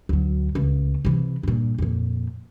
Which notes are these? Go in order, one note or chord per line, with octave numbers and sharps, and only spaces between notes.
D2 F#3
C#2 A3
C3 E3
G2 A#2
F2 A#2